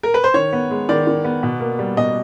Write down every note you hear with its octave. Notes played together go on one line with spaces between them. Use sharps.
A#4
B4
C5
D#3 C#5
B3
G#3
D#3 D5
D#3
B3
B2
A#3
G3
B2 D#5